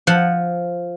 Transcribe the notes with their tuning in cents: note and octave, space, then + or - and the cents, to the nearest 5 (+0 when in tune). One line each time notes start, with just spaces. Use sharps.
F3 +0 F#5 +0